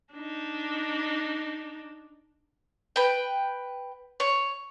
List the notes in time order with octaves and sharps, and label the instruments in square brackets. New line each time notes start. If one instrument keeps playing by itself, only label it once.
[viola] D4 D#4
[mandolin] B4 G5
C#5